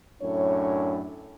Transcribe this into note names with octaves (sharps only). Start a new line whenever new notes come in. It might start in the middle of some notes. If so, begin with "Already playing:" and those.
F#2 A2 D4 C#5